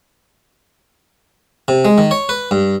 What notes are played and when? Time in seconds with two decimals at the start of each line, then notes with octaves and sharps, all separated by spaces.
1.68 C3
1.85 G#3
1.98 D#3
2.11 C#5
2.29 B4
2.51 G2